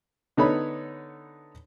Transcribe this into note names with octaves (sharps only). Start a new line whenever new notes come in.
D3 B3 D#4 A4 C#5 B5